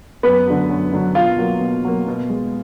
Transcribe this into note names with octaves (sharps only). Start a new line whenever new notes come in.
F#2 B3 B4
D3 F#3
F#2
D3 F#3
B2 F4 F5
F#3 A#3
B2
F#3 A#3
B2
G#3